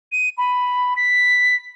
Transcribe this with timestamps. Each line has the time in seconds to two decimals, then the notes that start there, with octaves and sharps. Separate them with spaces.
0.12 D#7
0.38 B5
0.96 B6